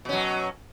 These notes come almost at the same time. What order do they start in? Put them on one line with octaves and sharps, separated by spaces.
B2 C#4 F#3